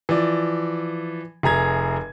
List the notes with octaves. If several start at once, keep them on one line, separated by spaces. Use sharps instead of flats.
E3 F3 D5
F1 G#4 A#5 G#6